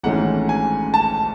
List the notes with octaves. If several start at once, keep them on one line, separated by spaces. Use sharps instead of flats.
G#1 G#2 E3 A3 C#4 F#5
G#5
A5